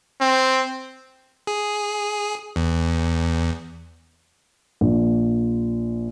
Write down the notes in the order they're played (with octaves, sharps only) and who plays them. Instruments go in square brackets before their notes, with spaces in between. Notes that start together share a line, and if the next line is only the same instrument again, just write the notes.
[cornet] C4
[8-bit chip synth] G#4
E2
[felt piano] A#1